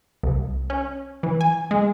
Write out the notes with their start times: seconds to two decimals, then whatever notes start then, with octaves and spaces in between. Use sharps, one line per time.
0.23 C2
0.70 C#4
1.23 E3
1.41 G#5
1.71 G#3